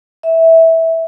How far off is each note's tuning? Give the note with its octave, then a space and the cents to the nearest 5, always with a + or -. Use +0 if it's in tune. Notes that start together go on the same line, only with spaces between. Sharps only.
E5 -15